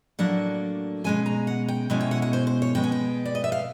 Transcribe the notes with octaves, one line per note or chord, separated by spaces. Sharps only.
A2 F#3 A#3 D4 F#5
B2 G#3 C#4 G#5
A#5
F#5
G5
B2 G#3 C#4 E4 G#5
G5
F#5
F#5
C5
C5
C#5
B2 G#3 B3 G5
G#5
G5
D5
D#5
E5
F5